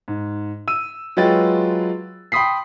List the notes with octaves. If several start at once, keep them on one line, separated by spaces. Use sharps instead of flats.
G#2
E6 D#7
F#3 G#3 F4 B4 G5 A6
G5 B5 C6 D#6 B6 C7